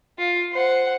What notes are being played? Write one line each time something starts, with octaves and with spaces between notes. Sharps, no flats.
F4
C5 F#5